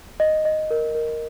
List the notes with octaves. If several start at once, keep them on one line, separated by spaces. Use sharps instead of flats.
D#5
D#5
A#4
A#4